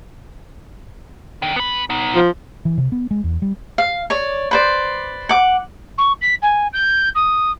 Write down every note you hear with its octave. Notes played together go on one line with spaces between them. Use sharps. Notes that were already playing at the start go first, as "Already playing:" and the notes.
D3 D#3
B3 B5
B3 D#4
F3
E3
C3
B3
G#3
E2
G3
F5
C#5 D5
B4 C5 D5
F#5 D6
C#6
B6
G#5
G6
D#6